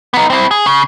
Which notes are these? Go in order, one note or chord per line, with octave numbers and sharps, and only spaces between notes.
B3 D#4
C4 E4
G#4
C#3